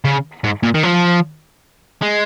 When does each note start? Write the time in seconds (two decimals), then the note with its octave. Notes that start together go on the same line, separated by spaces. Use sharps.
0.05 C#3
0.44 G#2
0.63 A#2
0.74 D#3
0.83 F3
2.02 G#3